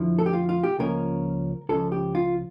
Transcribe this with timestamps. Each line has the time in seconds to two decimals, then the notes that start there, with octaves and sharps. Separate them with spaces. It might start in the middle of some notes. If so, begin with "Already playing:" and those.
Already playing: F2 D3 F3 E4
0.19 A4
0.26 G4
0.33 F4
0.49 F4
0.63 G4
0.79 C#2 C#3 F3 A#3 C#4 A#4
1.69 C#2 C#3 F3 A4
1.92 G4
2.15 F4